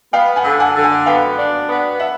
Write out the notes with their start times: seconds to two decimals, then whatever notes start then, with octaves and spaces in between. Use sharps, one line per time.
0.13 B3 F5 G5
0.36 F#5 G#5
0.44 D3
0.60 F#5 G#5
0.75 D3
0.83 F#5 G#5
1.06 B3 F5 G5
1.38 D4
1.69 B3
1.99 E5 F#5